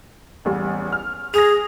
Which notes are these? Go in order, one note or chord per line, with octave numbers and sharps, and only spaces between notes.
A1 E2 G3
F6
G#4 A#6 F7